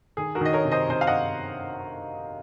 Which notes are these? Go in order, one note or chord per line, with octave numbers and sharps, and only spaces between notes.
D#3 G#4
F#4 A#4
D#3 D#5
A#4 C#5
C3
C5 D#5
C3 C5 D#5
F5
D#5 F#5